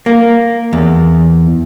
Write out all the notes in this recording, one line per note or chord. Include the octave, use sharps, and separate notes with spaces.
A#3
E2